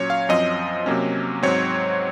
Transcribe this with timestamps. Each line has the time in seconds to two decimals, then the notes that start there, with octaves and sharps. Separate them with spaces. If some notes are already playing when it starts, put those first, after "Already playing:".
Already playing: A#2 F#3 C#4 C#5
0.10 F5
0.29 F#2 F3 C4 D#5
0.86 C3 F#3 A#3 C#4
1.43 G#2 F#3 C4 C#5